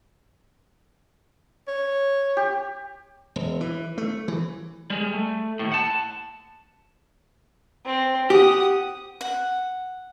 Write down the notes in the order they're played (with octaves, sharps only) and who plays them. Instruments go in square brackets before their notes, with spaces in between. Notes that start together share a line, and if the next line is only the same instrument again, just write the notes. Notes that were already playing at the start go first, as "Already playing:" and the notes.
[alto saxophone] C#5
[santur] G4
[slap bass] E1
E3
A3
E3
[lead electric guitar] G3 G#3
A3
D#2 A2
F#5 A5
[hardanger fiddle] C4
[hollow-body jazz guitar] G4 [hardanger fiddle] F#5 D#6
[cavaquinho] F#5